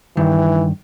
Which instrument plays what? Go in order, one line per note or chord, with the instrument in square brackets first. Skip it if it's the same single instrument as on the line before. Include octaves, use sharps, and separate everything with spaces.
[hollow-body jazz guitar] G2 D#3 [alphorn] E3